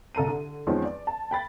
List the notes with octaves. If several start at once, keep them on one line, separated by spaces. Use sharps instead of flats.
C2 A4 A#5 D#7
D3
E2 F3 G#3 C4 C#4 D#4
D5
A5
G5 B5 A6